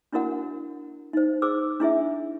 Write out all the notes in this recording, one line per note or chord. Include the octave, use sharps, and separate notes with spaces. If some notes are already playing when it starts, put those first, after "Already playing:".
D4 E4 F#4 A#4 F#5
D#4 C5
G#4 C5 D6 E6
D4 E4 G#4 E5